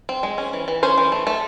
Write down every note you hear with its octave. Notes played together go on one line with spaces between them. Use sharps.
C4
G#3
C#4
E3
E3
C#4 C5
E3
A3
A3